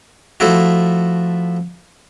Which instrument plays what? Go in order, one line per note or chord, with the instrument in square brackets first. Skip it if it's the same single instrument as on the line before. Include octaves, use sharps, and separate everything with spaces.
[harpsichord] F3 A3 E4 F#4